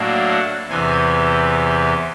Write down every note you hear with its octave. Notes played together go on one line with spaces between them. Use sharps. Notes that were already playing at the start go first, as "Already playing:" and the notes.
Already playing: A2 F#3 A#3 D4
F#5
E2 C3 E3 G#5